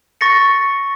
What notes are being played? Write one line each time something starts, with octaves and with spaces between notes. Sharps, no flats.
C#6 A6 A#6 C#7